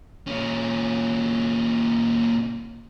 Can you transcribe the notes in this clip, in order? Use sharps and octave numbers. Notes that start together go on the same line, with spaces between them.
A#2 C#4